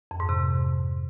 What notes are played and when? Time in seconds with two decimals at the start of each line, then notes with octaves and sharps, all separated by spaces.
0.11 F2
0.20 G#2
0.29 C3